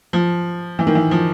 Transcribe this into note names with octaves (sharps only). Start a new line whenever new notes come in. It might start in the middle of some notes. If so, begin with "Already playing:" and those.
F3
E3
D#3
E3
F3